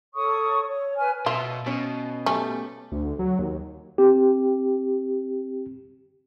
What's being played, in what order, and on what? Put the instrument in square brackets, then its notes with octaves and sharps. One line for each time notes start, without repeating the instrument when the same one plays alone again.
[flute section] A4 C#5 C#6 D#6
C#5
B4 G#5 F6
[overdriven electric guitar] B2 [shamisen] F4 [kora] E5
[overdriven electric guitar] B2 [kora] C#4
[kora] A3 G4 [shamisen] C#4
[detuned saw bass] D2
F#3
D#2
[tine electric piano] C4 G4